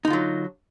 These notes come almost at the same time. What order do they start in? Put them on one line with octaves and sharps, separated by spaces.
D#4 D3 F4 F#3